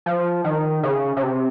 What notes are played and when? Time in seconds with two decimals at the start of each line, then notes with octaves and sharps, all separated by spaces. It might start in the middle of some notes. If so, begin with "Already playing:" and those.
0.06 F3
0.44 D#3
0.83 C#3
1.17 C#3
1.23 C3